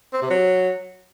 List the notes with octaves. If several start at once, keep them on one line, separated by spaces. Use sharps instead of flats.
C4
C3
F#3